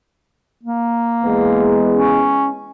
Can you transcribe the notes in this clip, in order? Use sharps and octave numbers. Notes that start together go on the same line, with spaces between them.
A#3
E2 G#3 B3
C#4